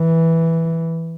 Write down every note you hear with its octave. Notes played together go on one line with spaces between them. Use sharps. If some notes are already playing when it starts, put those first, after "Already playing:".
Already playing: E3